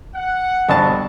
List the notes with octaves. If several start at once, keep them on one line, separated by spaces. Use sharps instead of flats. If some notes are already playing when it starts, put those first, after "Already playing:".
F#5
G1 F2 B2 D4 A5